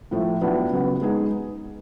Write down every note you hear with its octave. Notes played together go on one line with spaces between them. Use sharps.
A2 F3 A3
A2 F#3 B3 D4
C#3 F#3 B3
G#3 B3 D#4 G#4